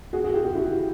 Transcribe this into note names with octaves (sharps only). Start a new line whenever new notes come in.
F#4 G#4
F#4 G#4
F4 G4
F4 G4
E4 F#4